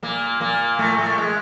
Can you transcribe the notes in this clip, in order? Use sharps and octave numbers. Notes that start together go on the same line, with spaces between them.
A#2 A#3
A#2 A#3
A2 A3
A2 A3
G#3